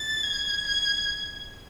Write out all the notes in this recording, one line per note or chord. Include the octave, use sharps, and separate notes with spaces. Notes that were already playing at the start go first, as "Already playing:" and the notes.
Already playing: A6
G#6
G#6